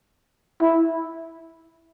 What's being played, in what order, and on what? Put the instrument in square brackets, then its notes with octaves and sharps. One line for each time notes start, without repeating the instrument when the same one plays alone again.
[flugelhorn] E4